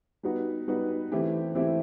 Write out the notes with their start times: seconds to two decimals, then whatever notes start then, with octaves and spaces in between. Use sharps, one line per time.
0.23 G3 B3 D#4 F#4 B4
0.68 G3 B3 D#4 F#4 B4
1.12 E3 A3 C4 E4 G4
1.55 E3 A3 C4 E4 G4